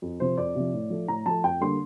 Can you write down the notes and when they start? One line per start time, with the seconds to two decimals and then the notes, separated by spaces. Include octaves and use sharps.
0.02 F2
0.20 C3 F3 C5
0.37 F2 D5
0.55 C3 F3
0.73 A2
0.90 F3 A3
1.08 A2 A#5
1.26 F3 A3 A5
1.44 F2 G5
1.61 D3 G3 A#3 C6